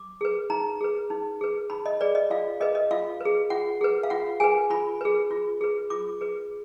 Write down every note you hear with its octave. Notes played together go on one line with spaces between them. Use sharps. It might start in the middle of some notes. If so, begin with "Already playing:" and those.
Already playing: D6
G#4 B4
D#4 A#5
G#4 B4
D#4
G#4 B4
D#4 B5
D#5
G#4 B4 D5
D#5
F4 F5
G#4 B4 D#5
D#5
F4 F5
G#4 B4
F4 F#5
G#4 B4
F5
F4 F#5
G#4 B4 G#5
F4 B5
G#4 B4
F4
G#4 B4
F4 D6
G#4 B4